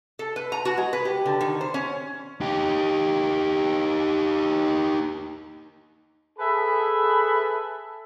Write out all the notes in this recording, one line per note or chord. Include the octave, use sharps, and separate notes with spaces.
A4
B4
A#5
F#4
G#3
B4
G4
D3
D#3
C5
C#4
D#4 G4
G#4 A4 B4 E5 A5 B5